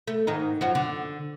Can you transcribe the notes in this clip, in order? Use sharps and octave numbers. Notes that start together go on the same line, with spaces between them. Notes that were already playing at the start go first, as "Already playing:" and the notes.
A3
G#2 D#3 D#4
F#2 F3 F#4
D3